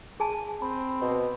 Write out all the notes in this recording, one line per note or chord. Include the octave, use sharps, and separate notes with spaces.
G#4 G#5 A5
C4 B5
B2